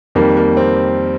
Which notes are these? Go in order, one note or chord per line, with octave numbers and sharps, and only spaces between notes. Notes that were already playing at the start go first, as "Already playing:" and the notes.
F2 D#3 G3 A#3
A#3
C4